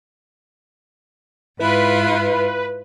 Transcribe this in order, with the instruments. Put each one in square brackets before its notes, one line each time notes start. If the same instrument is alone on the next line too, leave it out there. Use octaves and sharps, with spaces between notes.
[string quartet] G#2 E4 F4 [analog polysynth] B4